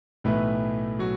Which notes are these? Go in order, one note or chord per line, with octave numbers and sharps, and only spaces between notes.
B1 A2 E3 A3 B3 B4
F#3 F#4